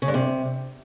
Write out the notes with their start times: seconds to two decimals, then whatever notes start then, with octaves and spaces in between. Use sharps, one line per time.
0.02 C#3
0.08 G2
0.14 C3